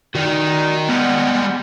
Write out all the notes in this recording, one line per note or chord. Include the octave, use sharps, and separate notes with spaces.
D#3 F#4 D5
G3 G#3 B3